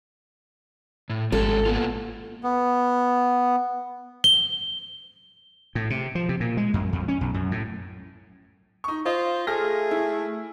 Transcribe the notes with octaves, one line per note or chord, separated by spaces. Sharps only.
A2
G#1 G#3 C#4 G4 A4
A#3 B3 F4
B3
G7
A2
C3
F3
C3
A#2
G#3
F#2
F2
C#4
B1
F#2
A2
D#4 C#6
F4 C5 D#5
A3 G#4 F6 A#6
E4